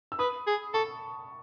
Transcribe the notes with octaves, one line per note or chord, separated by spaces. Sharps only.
E6
B4 B5 D#6
G#4
A4 A5 C#6